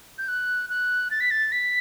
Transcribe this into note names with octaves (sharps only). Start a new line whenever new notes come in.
G6
F#6
F#6
A6
B6
A6
B6